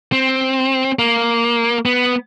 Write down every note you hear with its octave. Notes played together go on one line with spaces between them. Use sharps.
C4
A#3
B3